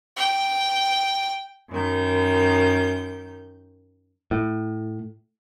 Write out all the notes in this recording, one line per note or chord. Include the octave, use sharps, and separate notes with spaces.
G5
F#2 D#3 G6
A2